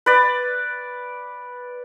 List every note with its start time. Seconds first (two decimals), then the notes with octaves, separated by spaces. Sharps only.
0.06 B4 D5